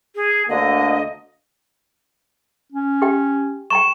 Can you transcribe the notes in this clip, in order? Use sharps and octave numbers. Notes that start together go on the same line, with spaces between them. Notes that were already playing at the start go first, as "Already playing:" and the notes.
G#4
D2 D3 A#3 D#5
C#4
G4 G5
G5 A#5 C#6 E7